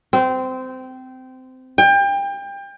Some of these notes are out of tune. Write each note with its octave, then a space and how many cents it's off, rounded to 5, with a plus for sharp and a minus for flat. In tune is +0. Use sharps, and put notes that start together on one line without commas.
C4 -20
G5 +30